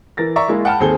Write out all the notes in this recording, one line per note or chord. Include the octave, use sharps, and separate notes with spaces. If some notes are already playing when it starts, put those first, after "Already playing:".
E3 A#4 A6 A#6
D5 E5 A#5 C#6
G#3 A#3 E4
F#5 G5 A5 B5 F6
D#2 C4 G#4 A4 G7